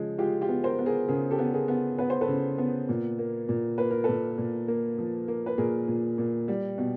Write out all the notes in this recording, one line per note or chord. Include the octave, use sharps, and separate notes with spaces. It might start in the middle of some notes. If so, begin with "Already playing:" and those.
Already playing: C#3 F3 G#3
G#3 F4 G4
F4 G4
B3
A#4 C5
B3
G#4 A#4
C#3 G#4 A#4
G4 A4
B3
G#4 A#4
B3
B3 B4
C5
A4 B4
C#3
B3
A#2
A#3
A#2
A#3 B4
A#4
A#2 A4 B4
A#2
A#3
F3
A#3
B4
A#2 G#4 A#4
A#2
A#2
G3
B2